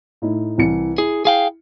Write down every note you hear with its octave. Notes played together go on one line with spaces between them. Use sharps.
A2 D#4 E4
C2 E3 C#7
E4 G#4
G#4 F5 G5